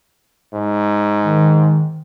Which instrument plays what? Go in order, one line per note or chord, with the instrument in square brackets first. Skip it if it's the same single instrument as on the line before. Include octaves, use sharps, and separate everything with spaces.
[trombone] G#2
[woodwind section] D#3